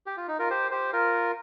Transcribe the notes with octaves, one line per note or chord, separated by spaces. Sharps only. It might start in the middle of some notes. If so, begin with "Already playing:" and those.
G4
F4
D#4
F4 A#4
G4 C5
G4 C5
F4 A#4